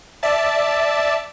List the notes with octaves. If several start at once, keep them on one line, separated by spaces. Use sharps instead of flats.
D5 E5 A5